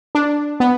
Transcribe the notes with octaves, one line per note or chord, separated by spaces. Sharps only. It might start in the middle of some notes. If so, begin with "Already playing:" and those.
D4
B3